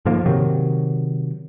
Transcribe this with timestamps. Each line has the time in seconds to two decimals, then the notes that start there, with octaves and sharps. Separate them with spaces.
0.05 G#2 D3 F3 A#3
0.26 C3 D#3 F#3